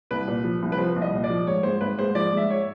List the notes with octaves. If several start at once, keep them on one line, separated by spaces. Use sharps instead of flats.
C2 B4
A#2
F3
C2
B4
F3 C5
C2
D#5
A#2
D5
F3
G#2 C#5
G#2 C5
G#1 B4
G#2 C5
F3 D5
G#2 E5
C#5